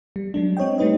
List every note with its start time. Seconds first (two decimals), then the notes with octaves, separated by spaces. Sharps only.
0.16 G3
0.34 F#3 G#3 D4
0.57 C4 C#5 D#5 G5
0.78 G3 A3 D#4 B4 D#5